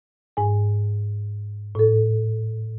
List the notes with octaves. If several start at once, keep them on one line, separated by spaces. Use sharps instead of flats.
G#2 G#5
A2 A4